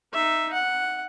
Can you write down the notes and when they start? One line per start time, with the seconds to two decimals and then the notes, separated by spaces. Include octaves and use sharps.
0.14 D#4 E5
0.53 F#5